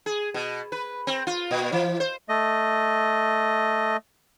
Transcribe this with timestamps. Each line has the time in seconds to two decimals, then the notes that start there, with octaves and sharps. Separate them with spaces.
0.06 G#4
0.34 B2
0.72 B4
1.07 C4
1.27 F4
1.51 A#2
1.72 E3
2.00 C5
2.29 A3 D#5